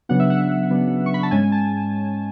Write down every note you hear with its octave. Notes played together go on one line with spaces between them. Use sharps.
C#3 F#3 B3 D4 F#5
E5
F#5
C#3 F#3 B3 D4
C#6
B5
A5
G#2 G#3 C#4 G#5
A5